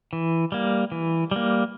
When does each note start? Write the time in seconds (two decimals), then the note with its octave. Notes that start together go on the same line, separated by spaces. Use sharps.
0.13 E3
0.52 G3 A#3
0.92 E3
1.31 G3 A#3